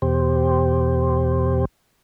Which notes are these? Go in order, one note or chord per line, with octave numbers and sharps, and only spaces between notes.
E2 B2 G4 C5